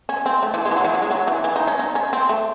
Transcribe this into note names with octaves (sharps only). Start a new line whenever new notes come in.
C#4
C4
A3
E3
G#3
E3
F#3
E3
F#3
G#3
F#3
E3
E3
D#4
C#4
D#4
C#4
C4
A3